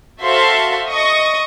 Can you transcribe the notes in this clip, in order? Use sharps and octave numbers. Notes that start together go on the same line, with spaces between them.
F#4 A4 C5 E5 F5 C6
D#5 C#6 D#6